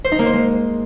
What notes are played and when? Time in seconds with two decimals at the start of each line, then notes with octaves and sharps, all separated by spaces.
0.04 C5
0.12 D#4
0.19 A#3
0.26 C5
0.33 G#3